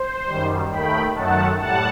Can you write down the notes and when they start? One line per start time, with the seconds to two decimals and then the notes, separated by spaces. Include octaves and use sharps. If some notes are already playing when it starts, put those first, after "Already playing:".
Already playing: C5
0.26 F#2 D#3 G3
0.70 D#2 D#3 A3 G5 B5
1.15 F#2 D#3 F#3 A3 F#5 A5
1.59 A2 G3 F#5 A5